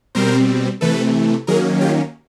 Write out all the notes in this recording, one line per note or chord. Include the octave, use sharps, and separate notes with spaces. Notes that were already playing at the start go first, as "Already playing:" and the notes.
B2 G3 C4 A#4 C5
C3 E3 A3 A4 B4
D#3 F#3 A#3 C#4 G#4 A#4
F4 G4